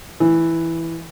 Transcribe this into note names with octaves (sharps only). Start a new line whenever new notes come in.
E3